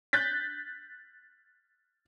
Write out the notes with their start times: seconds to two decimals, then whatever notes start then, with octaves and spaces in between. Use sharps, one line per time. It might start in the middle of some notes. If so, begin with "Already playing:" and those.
0.13 F#6 G6 A6 B6